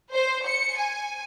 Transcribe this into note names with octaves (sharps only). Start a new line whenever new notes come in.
C5
C#7
G#5